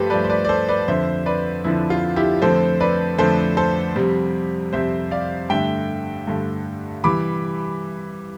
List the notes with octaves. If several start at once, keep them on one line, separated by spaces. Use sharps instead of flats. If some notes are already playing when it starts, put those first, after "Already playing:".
Already playing: G2 F3 A3 G4 A4 B4 C5
G2 F3 A3 B4 D5
C5
B4 D5
D5
A4 C5
B4 D5
F2 D3 F3 C5 E5
B4 D5
F2 D3 F3 E4
F4
E4 G4
F2 D3 F3 A3 C4 A4 C5
B4 D5
F2 D3 F3 A3 C4 A4 C5
A4 C5
F2 C3 G3 C4
F2 C3 G3 C4 C5 E5
D5 F5
G2 D3 A3 E5 G5
G2 D3 A3
C3 E3 G3 B5 D6